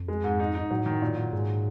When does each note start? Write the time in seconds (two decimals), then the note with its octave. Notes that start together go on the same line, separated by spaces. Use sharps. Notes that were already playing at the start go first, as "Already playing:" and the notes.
Already playing: F2
0.08 G#3
0.24 G#2
0.40 D#4
0.55 D#4
0.71 A2 F#3
0.86 D#3
1.02 A#2
1.17 F#3
1.33 G#2 G#3